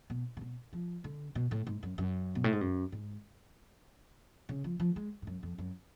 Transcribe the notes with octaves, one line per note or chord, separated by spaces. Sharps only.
B2
C#3
B2
F3
D3
B2
A2
G#2
F#2
F#2
B2
A2
G#2
F#2
G#2
C#3
F3
F3
G#3
G#2
F#2
F2
F#2